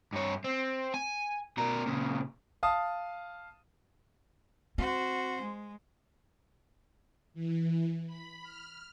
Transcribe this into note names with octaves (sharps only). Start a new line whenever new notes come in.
G2 C#5
C4
G#5
B2 A#4
A#2 C#3
F5 A5 D#6
C4 F#4 C5
G#3
E3
B5
F6